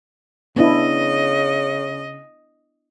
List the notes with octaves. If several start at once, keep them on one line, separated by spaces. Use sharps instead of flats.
C#3 B3 D4 E4 D#5